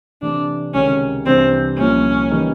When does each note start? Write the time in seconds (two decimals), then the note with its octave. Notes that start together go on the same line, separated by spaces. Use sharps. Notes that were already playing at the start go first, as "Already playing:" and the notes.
0.22 C3 E3 A3 D4
0.74 C#2 C3 D#3 C#4
1.26 C2 C3 E3 A3 C4 D4
1.78 C2 A#2 F3 A#3 C#4
2.30 C#3 E3 G3 A#3 D#4